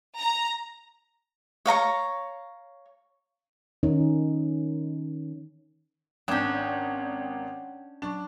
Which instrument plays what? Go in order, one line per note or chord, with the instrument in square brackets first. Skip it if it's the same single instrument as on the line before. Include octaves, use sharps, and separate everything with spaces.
[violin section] A#5
[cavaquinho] C#5 F5 A#5 C#6
[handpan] D#3 C#4 D#4
[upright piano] G#1 G6 [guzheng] C#4 D4 [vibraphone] F#5 G5
[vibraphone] F#3 C#6 [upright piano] D4